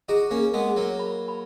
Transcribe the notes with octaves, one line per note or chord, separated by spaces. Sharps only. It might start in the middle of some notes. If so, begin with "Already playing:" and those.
D#4 F#4 G#4
A#3 C#4
G#4
G#3 B3
G#4
F#3 A#3
B5
B5